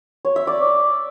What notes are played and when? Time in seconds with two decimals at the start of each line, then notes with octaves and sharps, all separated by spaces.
0.25 C#5
0.36 E5
0.47 D5